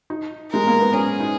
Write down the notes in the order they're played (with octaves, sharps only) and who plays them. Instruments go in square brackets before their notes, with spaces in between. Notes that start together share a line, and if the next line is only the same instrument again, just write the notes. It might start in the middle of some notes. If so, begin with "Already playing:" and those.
[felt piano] D#4
[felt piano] G#3 [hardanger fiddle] A#4
[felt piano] A#3
B3
[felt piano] C#4 [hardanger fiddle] G#4
[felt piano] D#4